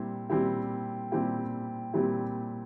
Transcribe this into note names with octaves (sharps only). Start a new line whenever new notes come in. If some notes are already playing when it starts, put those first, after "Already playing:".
Already playing: A#2 G3 C4 E4
A#2 G3 C4 E4 G4
A#2 G3 C4 E4 G4
A#2 G3 C4 E4 G4